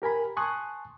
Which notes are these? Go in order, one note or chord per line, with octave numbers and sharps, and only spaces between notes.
G4 A#4 G#5 B5
G#5 A5 C6 C#6 D#6 F#6